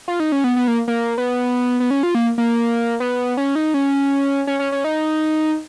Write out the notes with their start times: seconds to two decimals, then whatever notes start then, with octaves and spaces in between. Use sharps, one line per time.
0.08 F4
0.20 D#4
0.32 C#4
0.44 B3
0.56 B3
0.68 A#3
0.88 A#3
1.18 B3
1.80 B3
1.91 C#4
2.03 F4
2.15 A#3
2.38 A#3
3.00 B3
3.37 C#4
3.55 D#4
3.74 C#4
4.47 C#4
4.59 C#4
4.72 C#4
4.84 D#4